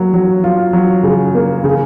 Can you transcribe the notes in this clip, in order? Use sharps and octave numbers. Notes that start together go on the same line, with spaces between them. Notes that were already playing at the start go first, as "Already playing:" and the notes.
Already playing: F#3 A#3
F#3
F4
F#3
C#3
A#3
C#3